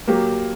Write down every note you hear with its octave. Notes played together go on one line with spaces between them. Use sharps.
F#3 A#3 G4